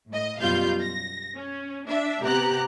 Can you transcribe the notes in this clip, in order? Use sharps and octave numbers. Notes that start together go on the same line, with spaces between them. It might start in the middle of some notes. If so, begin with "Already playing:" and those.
A2 D#5
F#2 B2 G3 F4 F5 G6
A#6
C#4
D4 E5
C3 B3 G4 A#5 F#6